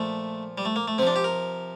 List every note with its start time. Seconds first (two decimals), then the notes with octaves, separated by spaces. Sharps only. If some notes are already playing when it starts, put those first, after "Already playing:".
Already playing: A#2 F3 A3
0.58 G3
0.65 A3
0.76 A#3
0.88 A3
0.98 C3 C4
1.02 F3 D4
1.16 G4
1.24 A#4